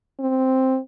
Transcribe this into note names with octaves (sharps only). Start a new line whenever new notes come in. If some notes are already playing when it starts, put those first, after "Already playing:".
C4